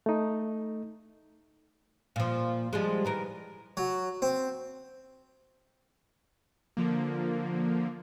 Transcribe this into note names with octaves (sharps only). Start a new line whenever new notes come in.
A3 D#4
A#2 F3
F3 G3 G#3
D#3 E3 A#4
F#3
C4
D3 F3 A#3